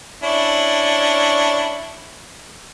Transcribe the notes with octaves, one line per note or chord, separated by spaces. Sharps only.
C#4 D4 E4